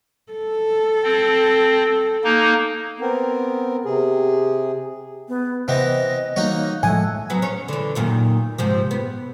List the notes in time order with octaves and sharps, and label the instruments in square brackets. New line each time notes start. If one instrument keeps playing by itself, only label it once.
[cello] A4
[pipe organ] C4
A#3 D#4
[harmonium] B3 C4 A#4
C3 G#4
[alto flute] B3
[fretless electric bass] C3 [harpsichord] E3 B3 C4 [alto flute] D#5
[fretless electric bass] E3 G3 [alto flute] A#3 [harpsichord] D#4 F#4 C#5
[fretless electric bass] A2 F3 G#3 [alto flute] A3 [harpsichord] F#5 [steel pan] G#5
[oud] F#3 B3 F#4
C#4 C#5
D3 E3
F#2 A#2 D#3
G#2 C3 F3
B3